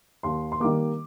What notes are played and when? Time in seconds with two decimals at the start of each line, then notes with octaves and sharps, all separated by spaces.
0.23 D#2 C6
0.52 C6
0.60 D#3 G3 A#3 D6